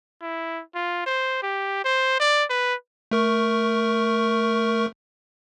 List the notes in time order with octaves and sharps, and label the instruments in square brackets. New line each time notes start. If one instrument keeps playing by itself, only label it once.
[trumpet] E4
F4
C5
G4
C5
D5
B4
[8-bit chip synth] A3 A#4 C#6